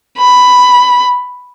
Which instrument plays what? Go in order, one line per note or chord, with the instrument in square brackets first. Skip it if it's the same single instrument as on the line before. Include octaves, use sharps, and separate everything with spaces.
[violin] B5